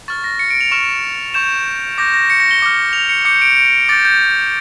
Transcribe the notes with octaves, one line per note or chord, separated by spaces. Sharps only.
C#6 F6 A6
A#6
C#7
D7
F7
C#6 F6 E7
C#6 G6 E7
D6 G6 A#6
A#6
C#7
A#6
G7
D6 F6
F7
C#7
D6 G6 C#7
D7
D7
D6 G6 A6
G6